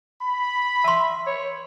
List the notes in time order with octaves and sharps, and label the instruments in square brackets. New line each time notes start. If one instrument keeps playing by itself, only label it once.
[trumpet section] B5
[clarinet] E5 [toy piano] A5 C6
[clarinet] C#5